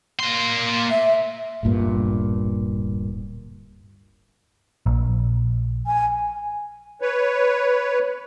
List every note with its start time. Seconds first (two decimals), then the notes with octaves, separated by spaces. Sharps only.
0.20 A#3 C6
0.91 E5
1.63 D1 G1 G2 A#2
4.86 A#1
5.87 G#5
7.01 B4 C#5